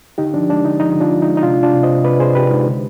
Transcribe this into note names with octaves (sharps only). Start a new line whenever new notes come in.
D3 D#4 G4
F3 D4
G#3 D4
D3 D#4
F3 D#4
D3
D4 F4
F3
G#3 D#4
D#4
C3 D4 F4
C3
D4 F4
C3
C5 D#5
C3
C3 B4 D5
C3 G#4 C5
C3 G4 B4
G#3 D#4
D3